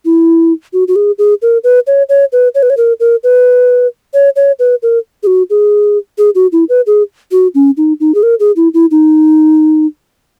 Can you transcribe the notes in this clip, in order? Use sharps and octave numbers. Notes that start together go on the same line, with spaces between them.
E4
F#4
F#4
G#4
G#4
A#4
B4
C#5
C#5
B4
C#5
B4
C#5
A#4
A#4
B4
C#5
C#5
B4
A#4
G#4
F#4
G#4
G#4
F#4
E4
B4
G#4
F#4
C#4
D#4
D#4
G#4
A#4
G#4
E4
E4
D#4